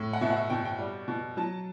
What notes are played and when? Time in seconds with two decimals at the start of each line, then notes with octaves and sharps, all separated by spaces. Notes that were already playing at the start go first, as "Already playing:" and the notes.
Already playing: A2
0.13 F#5
0.21 B2 E5
0.30 F#5
0.36 E5
0.50 B2 G5
0.65 G5
0.79 G3
1.08 B2
1.37 F#3 A5